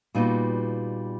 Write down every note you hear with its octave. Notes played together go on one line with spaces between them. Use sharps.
A#2 G3 B3 D#4 F#4